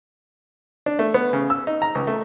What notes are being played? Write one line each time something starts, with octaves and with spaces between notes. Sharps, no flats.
D4
A3
B3
C#3
E6
D#4
A#5
C#2
A3